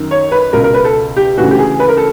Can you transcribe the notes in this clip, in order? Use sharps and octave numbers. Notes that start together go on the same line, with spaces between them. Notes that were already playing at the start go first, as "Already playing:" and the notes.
Already playing: F#2 D#3
C#5
B4
C#2 B2 A#4
A#4
B4
A4
G4
D2 C#3 E3 F#4
G4
G#4
B4
A#4
A4